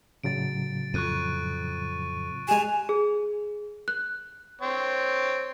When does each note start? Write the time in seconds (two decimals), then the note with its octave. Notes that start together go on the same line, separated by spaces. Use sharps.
0.24 A2 C#3 F#3 A6 D7
0.94 F2 C#6 F#6 D#7
2.49 G#3 G4 G#5 E7 F7
2.89 G#4
3.88 F#6
4.61 C4 C#5